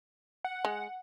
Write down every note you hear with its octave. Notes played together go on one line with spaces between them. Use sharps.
F#5
G#3